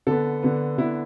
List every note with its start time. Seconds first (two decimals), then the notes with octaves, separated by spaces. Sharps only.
0.07 D3 B3 A4
0.43 D3 B3
0.78 D3 B3 E4